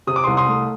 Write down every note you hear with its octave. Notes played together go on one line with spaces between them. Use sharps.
C3 D#6
D6
C2 C6 D#6
C6 D#6
A3